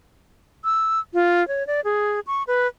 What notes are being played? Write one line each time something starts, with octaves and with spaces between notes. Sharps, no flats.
E6
F4
C#5
D5
G#4
C#6
B4